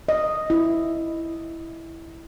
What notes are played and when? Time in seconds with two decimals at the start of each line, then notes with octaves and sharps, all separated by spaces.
0.09 D#5
0.50 E4